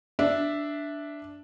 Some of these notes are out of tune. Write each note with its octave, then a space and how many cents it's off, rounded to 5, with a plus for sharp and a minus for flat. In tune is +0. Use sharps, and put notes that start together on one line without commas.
D4 +0 E5 +0